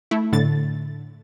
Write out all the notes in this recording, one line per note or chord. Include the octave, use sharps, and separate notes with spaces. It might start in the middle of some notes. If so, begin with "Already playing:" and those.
A3 E4
A2 D3 A6